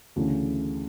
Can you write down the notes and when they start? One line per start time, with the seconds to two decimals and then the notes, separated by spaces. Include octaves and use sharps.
0.16 D2 C#3 E3 A3 C#4